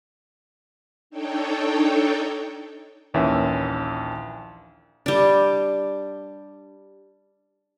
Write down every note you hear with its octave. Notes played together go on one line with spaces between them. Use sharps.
D4 D#4 A4 C#5 G5
A#1 D#2 E3 C#4 E5
G3 D4